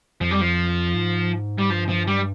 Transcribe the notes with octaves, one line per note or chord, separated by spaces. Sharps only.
F2 F3
G3
F3
G#2
G3
G2 F3
F3
G3